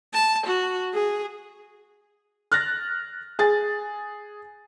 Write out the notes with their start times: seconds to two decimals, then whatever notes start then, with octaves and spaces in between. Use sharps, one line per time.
0.14 A5
0.46 F#4
0.94 G#4
2.52 F6 F#6 A6 A#6
3.39 G#4 A6